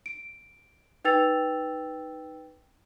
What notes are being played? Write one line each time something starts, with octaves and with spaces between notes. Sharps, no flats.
D7
D#4 B4 G5 E6 A6 F7